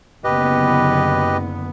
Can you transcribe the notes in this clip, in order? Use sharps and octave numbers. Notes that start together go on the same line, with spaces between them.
F#1 D3 B3 G4 B4 D#5